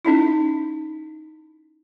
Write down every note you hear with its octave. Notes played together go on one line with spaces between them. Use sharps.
C#4 D#4 E4